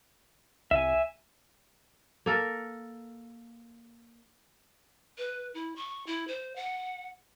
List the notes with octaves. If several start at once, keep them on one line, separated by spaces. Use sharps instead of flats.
C2 E5 G#5
A#3 A4 A#4
B4
E4
C#6
E4
C5
F#5